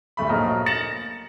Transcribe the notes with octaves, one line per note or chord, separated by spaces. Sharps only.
D1 G2 A3 B5
A#1 F#3 A#3 A4 A#4 D#5
A6 A#6 C#7 E7 F#7